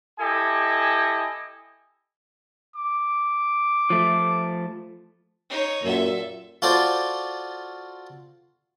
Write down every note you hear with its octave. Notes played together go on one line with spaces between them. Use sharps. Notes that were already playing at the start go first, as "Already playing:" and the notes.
E4 G4 A4 D#5 G#5
D6
F3 A3
D#4 C#5
F#2 A#2 A4 E5
F4 F#4 A4 C5 D5